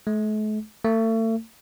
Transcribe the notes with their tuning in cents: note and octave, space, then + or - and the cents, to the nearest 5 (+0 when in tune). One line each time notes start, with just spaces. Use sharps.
A3 -45
A3 +35